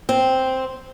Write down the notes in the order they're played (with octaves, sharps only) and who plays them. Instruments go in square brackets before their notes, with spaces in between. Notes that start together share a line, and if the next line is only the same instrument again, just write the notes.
[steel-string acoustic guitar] C4